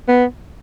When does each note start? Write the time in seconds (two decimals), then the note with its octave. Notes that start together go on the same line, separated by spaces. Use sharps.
0.08 B3